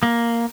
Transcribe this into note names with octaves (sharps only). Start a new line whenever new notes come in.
A#3